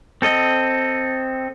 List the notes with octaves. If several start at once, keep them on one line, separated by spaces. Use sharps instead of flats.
C4 A4 D#5